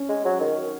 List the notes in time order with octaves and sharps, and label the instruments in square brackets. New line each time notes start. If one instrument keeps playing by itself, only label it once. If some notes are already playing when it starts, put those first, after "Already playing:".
Already playing: [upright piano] C#4
[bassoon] G#3
F#3
D#3